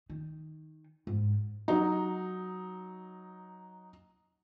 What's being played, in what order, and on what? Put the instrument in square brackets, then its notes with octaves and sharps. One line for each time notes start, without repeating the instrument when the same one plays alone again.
[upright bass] D#3
G#2
[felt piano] F#3 D#4